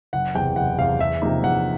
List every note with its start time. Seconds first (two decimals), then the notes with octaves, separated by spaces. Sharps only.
0.13 F#1 F#5
0.35 E2 C3 G5
0.56 F#1 F#5
0.78 E2 C3 F5
1.00 E2 E5
1.22 C3 F3 A#3 D#4
1.43 E2 F#5